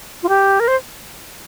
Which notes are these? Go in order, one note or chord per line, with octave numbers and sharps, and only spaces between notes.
F4
G4
A#4
C5